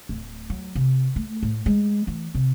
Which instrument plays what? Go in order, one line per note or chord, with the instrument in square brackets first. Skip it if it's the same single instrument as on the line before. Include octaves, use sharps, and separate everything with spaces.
[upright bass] D1
F#3
C3
A3
A2
G#3
E3
C3